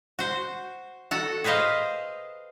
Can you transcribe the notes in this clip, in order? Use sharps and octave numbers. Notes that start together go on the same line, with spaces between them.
F#4 C5
F#4 A4 F#5
G#4 B4 C5 D#5 F5